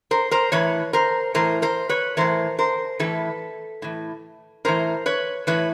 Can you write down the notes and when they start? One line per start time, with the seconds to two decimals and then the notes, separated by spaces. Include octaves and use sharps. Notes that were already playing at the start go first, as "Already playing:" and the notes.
0.11 A#4 C5
0.31 A#4 C5
0.52 A2 E3 B4 C#5
0.93 A#4 C5
1.34 A2 E3 A#4 C5
1.62 A#4 C5
1.89 B4 C#5
2.17 A2 E3 A#4 C5
2.59 A#4 C5
2.99 A2 E3 A4 B4
3.82 A2 E3
4.65 A2 E3 A#4 C5
5.06 B4 C#5
5.47 A2 E3 B4 C#5